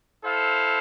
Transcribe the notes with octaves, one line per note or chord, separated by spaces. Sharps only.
E4 A4 C5 F5